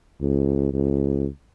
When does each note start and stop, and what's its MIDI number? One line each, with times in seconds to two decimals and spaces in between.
0.21 0.73 37
0.73 1.26 37